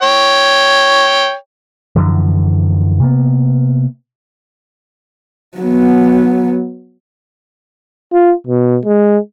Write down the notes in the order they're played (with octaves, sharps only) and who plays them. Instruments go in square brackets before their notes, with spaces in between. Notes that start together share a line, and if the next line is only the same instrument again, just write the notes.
[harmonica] C#5 G5
[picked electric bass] F#2 D3 E3 F3
C3 A#3 B3
[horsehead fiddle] F#3 B3
[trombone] F4
B2
G#3